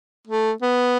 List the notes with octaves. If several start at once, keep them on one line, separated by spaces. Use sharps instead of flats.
A3
B3